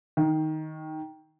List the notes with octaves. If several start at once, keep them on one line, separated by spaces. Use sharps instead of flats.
D#3